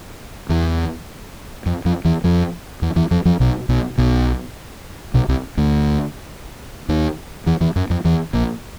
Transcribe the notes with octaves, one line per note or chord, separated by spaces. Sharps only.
E2 E3
F2 F3
F2 F3
E2 E3
F2 F3
E2 E3
E2 E3
F2 F3
F2 F3
B1 B2
B1 B2
B1 B2
B1 B2
C2 C3
D2 D3
D#2 D#3
E2 E3
E2 E3
F#2 F#3
F2 F3
E2 E3
A#1 A#2